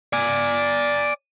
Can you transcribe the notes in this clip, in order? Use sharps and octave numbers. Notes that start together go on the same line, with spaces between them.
D5 G#5